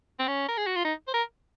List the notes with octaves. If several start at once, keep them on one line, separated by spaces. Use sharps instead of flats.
C4
C#4
A#4
G#4
F#4
F4
D#4
C5
A#4